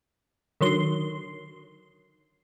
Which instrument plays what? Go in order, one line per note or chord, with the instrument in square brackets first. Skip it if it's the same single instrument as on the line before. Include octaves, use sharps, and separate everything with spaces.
[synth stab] D3 D#3 F#3 C6